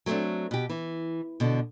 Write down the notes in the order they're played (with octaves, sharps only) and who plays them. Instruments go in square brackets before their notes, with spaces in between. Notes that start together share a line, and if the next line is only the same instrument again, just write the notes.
[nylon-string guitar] F#3 A3 A#3 C4 D4
B2 G4
E3
B2 D3